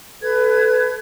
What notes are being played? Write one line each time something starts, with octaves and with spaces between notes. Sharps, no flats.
A4 B4 G#6